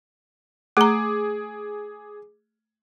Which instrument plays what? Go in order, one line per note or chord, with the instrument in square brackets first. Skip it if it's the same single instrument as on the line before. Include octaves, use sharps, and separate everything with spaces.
[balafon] A3 A#5 [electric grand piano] G#4 D6